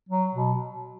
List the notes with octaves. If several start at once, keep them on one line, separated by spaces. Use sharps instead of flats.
F#3
B2